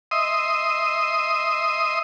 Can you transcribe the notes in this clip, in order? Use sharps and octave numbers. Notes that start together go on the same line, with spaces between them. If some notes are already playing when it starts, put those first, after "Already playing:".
D#5 E5 C6 D#6